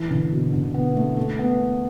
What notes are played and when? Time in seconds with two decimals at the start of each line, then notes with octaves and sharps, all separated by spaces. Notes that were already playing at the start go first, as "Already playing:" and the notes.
Already playing: E3
0.10 D3
0.31 B2
0.53 D3
0.74 B3
0.96 A3
1.17 A3
1.39 B3